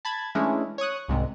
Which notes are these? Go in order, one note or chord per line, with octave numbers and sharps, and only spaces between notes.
A5 B5 G#6 A6
E3 G#3 A3 C#4 D4 E4
C#5 C#6 D#6 F#6
C2 G#2 C3